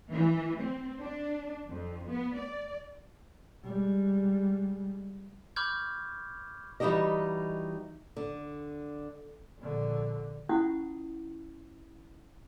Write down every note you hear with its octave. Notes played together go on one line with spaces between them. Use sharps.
E3
C4
D4
F2
B3
D5
G3 G#3
B5 C#6 D6 F6 G6 G#6
E3 G3 D#4 F#4 G4 D#5
D3
A#1 D3
C#4 E4 F4 F#5 C#6 D#6